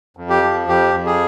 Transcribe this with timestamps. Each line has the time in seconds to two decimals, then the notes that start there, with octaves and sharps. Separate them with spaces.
0.17 F2
0.30 G4
0.43 F3
0.68 F2 G4
0.94 F2
1.06 G#4